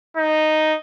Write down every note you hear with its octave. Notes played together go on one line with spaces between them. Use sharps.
D#4